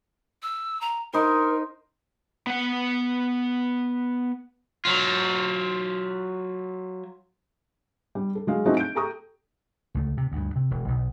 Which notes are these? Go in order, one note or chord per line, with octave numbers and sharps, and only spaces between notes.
E6
A#5
D#4 A#4 C5
B3 F#5
F#3 F4
G3
A4
F#3 G#3 F5
F#3 A3 C4 C#4 D#4 F#4
G6 D7
G4 A4 G5 A#5 C#6 D#6
C#2 A3
C3
D2 G2
C3
E1
B1 B2